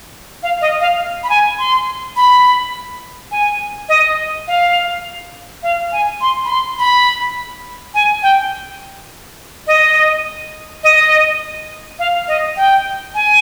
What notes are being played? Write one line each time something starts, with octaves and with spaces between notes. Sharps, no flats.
F5
D#5
F5
B5
G#5
C6
B5
G#5
D#5
F5
F5
G#5
C6
B5
C6
B5
G#5
G5
D#5
D#5
F5
D#5
G5
G#5